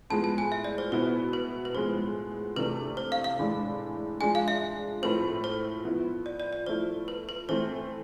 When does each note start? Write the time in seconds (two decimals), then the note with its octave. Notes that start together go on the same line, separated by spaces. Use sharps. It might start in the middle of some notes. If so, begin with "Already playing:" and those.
0.10 A2 F3 G#3 B3 A5
0.24 A5
0.38 G#5
0.52 E5
0.64 D5
0.78 C5
0.92 B2 B3 E4 C5
1.33 B4
1.65 B4
1.74 A2 F3 G#3 B3 C5
2.56 C3 E3 A3 D4 B4
2.97 C5
3.12 F5
3.24 F5
3.38 A2 E3 G#3 D4
4.21 F3 G#3 D4 G#5
4.35 F5
4.48 E5
5.02 A2 F3 A3 C4 B4
5.44 C5
5.84 F3 B3 E4
6.26 D5
6.40 D5
6.53 D5
6.66 F3 A3 E4 C5
7.08 B4
7.29 B4
7.49 E3 A3 C4 E4 C5